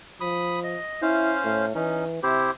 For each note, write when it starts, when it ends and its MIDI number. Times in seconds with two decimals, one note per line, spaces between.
0.21 0.78 53
0.21 0.59 83
0.21 0.59 87
0.64 1.01 75
1.02 1.66 61
1.02 1.35 64
1.02 1.66 72
1.02 1.66 77
1.44 1.73 45
1.75 2.21 52
1.75 2.04 61
1.75 2.04 63
2.23 2.49 48
2.23 2.51 64
2.23 2.51 67
2.23 2.51 72